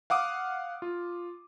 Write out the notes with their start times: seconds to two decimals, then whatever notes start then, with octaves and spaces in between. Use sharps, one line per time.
0.10 F5 F#5 D6 D#6
0.82 F4